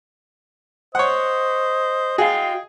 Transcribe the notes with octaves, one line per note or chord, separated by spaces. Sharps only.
C5 C#5 D#5 F#5
F#4 G#4 F5 G5